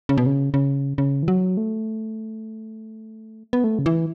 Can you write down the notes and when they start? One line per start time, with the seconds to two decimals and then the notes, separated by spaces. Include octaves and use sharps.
0.09 C#3
0.18 B2
0.26 C#3
0.54 C#3
0.98 C#3
1.23 E3
1.28 F#3
1.57 A3
3.53 B3
3.64 A3
3.79 C#3
3.86 E3